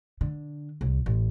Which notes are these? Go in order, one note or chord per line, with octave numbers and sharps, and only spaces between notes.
D3
C2
A1